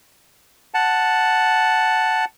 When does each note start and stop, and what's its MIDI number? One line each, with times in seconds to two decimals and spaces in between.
0.74 2.25 78
0.74 2.25 81